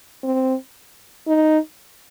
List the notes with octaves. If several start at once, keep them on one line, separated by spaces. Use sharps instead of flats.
C4
D#4